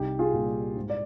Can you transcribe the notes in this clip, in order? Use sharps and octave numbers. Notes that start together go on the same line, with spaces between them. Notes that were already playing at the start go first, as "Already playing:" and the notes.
Already playing: C2 D#4 G4
F4 G#4
A#2 G3
G#2
D5